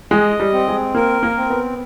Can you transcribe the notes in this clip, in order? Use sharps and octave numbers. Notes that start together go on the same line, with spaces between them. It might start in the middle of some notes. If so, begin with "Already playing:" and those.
G#3 D#5
G3
C4
G#3
A#3 A#4
A#3
C4
B3